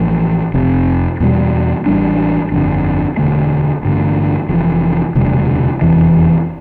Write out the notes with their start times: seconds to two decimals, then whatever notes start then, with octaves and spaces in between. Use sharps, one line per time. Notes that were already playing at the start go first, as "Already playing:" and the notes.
Already playing: A1 A2 F3
0.54 F1 F2 C3
1.20 E2 B2 G3
1.86 A1 A2 G3 D4
2.52 G1 F2 D3
3.17 E1 D2 D3 A3
3.83 A1 G2 D3 A3
4.49 F1 F2 E3
5.15 E1 D2 C3 G3
5.81 F1 E2 C3 E3